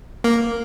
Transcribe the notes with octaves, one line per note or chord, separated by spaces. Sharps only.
A#3